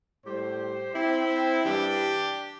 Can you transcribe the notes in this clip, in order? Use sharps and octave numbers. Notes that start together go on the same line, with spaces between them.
A2 G3 G4 C5
C4 E4
G2 E3 G3 D4 G4